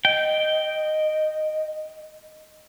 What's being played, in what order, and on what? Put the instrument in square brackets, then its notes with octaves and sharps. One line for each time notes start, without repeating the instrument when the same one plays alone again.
[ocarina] D#5 [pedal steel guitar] G5